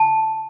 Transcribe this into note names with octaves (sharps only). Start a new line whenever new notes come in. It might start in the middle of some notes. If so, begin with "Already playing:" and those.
Already playing: A5